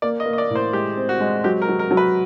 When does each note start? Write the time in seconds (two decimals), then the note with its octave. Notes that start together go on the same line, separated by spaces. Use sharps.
0.02 A#3 D5
0.20 D#5
0.26 A#3
0.33 D#5
0.38 D5
0.50 A2
0.55 C5
0.73 G#3 G4
0.97 C4
1.09 F#4
1.20 G#3
1.44 F#3 G4
1.62 A#4
1.68 F#3
1.79 A#4
1.91 F#3
1.97 B4